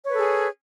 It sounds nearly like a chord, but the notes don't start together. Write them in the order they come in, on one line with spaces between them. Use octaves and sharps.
C#5 B4 A4 G#4